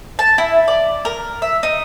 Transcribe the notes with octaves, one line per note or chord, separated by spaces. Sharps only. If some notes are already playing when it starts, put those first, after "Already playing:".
A5
E4
D5
A#4
E5
D#4